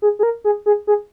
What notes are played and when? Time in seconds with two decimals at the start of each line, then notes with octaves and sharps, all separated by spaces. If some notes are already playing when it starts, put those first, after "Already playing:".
0.02 G#4
0.19 G#4
0.23 A#4
0.44 G#4
0.66 G#4
0.87 G#4